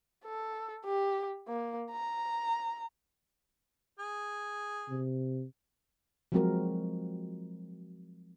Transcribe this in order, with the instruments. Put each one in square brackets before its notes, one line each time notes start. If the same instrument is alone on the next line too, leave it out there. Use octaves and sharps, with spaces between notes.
[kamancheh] A4
G4
A#3
A#5
[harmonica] G#4
[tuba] C3
[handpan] F3 F#3 G#3 C4 F#4 A#4